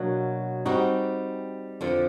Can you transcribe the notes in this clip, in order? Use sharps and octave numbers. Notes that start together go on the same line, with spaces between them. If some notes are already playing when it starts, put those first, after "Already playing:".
Already playing: B2 F#3 A#3 D4 F#4
G3 C4 D#4 F#4
F2 D3 F3